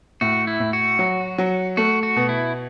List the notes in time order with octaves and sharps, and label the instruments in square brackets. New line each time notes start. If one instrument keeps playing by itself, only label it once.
[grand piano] A2 [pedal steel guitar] F#4
[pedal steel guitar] E4
[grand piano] A2
[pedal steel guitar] F#4
[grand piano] F#3
F#3
[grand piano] A3 [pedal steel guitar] F#4
[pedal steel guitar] F#4
[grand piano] B2
[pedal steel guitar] E4